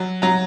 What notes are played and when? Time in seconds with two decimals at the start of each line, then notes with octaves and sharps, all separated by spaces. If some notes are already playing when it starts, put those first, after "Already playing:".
Already playing: F#3
0.22 F#3 A#5